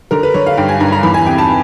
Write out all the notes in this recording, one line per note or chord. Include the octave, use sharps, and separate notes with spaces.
D3 A#4
B4
D3 C#5
F5
G2 G5
G#5
G2 A#5
A#5
E2 B5
G#5
C3 G5
A5